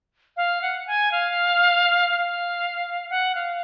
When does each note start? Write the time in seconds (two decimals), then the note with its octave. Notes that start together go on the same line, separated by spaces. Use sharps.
0.37 F5
0.62 F#5
0.87 G#5
1.12 F5
2.10 F5
3.10 F#5
3.35 F5